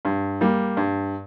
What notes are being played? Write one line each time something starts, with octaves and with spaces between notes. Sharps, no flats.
G2
G3 A#3
G2